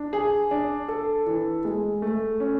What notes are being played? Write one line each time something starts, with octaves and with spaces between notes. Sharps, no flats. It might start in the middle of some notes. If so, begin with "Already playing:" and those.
Already playing: D4
G#4
D4
A4
E3
G#3
A3
C#4